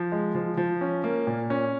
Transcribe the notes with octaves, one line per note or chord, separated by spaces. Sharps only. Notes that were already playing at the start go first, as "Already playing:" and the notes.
Already playing: F3
G#3
F3
F3
C#4
A#3
A#2
C#4